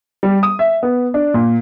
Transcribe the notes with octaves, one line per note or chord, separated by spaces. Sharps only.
G3
D#6
E5
B3
D4
A#2